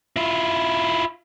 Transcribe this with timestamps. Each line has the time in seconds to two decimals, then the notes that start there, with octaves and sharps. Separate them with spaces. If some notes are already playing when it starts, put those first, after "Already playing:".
0.16 E4 F4